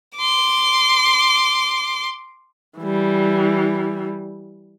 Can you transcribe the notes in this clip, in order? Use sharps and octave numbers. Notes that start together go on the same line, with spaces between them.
C6 D6
E3 G3